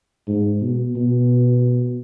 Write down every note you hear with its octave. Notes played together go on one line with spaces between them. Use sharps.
G#2
B2
B2